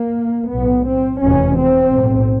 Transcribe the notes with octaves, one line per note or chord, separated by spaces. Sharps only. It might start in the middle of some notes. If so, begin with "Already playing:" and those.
Already playing: A#3
B1 A2 B3
C4
F1 E2 B2 C#4
C4
B1 A2